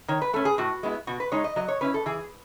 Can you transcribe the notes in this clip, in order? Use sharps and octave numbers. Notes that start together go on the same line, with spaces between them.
D#3 C#5
B4
A3 C#4 A4
G#4
A2 F#4
G#3 B3 E4
B2 F#4
B4
G#3 D#4 C#5
D#5
F#3 D#5
C#5
C#4 E4 B4
A4
E3 G#4